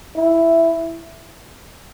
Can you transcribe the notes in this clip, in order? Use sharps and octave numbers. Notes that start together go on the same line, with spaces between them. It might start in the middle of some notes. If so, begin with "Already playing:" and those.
E4